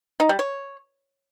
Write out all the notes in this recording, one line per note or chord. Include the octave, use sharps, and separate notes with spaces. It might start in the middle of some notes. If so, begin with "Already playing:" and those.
D#4
G3
C#5